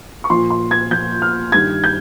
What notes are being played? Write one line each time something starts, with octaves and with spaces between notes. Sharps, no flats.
C#6
A#2 F3 C6
C6
G#6
A#2 F3 G6
F6
G2 D#3 G#6
G6